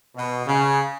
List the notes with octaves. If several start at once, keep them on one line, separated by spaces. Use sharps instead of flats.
B2
C#3